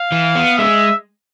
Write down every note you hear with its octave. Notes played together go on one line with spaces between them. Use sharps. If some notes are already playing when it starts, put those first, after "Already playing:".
Already playing: F5
E3
B3
G#3 E5